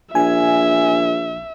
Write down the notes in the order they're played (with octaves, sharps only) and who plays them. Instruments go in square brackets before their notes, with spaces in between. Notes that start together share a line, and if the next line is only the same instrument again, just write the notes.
[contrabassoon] A#1 [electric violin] E5 [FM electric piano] G#5